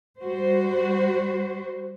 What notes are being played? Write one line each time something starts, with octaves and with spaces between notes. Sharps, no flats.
G3 F#4 C5